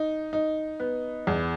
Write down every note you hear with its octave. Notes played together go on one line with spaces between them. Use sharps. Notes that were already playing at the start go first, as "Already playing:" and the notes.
Already playing: D#4
D#4
B3
E2